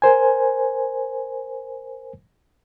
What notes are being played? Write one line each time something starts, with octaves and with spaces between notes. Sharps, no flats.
A#4 C5 G#5